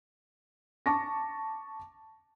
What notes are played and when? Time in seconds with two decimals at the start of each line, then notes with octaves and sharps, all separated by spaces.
0.86 A5 C#6 D6 A#6